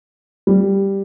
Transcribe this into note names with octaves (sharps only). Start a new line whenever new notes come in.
G3